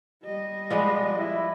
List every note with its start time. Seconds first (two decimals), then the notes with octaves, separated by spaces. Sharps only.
0.23 G3 D#5
0.70 F3 G#3 B3 D5
1.18 E4